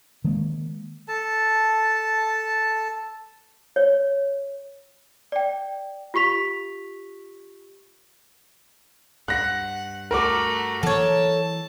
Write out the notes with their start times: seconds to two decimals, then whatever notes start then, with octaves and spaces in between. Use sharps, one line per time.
0.24 D#3 G#3 A#3
1.08 A4 A5
3.76 C#5
5.32 D5 G5
6.14 F4 G4 C#6 B6 F7
9.28 G2 F#5 F#6 A#6
10.11 A3 F#4 A#4 A#5 D6
10.83 E3 F#3 A#3 A4 C#5 A5